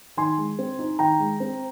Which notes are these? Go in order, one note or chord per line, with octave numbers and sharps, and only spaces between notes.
D#3 G#5 C6
G#3
C4
D#4
D#3 G5 A#5
G#3
C4